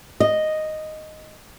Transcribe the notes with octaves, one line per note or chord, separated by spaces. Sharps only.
D#5